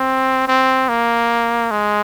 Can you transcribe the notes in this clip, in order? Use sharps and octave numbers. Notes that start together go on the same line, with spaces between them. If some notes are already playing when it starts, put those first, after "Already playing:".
Already playing: C4
C4
A#3
G#3